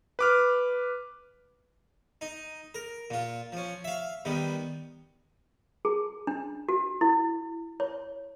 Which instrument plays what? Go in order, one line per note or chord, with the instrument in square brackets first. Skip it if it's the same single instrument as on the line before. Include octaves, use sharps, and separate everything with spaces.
[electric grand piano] B4 D6 F6
[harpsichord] D#4
A#4
A#2 F4
F3 C#4
E5 F5
D#3 G3 B3
[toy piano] G#4
D4
F#4
E4
C#5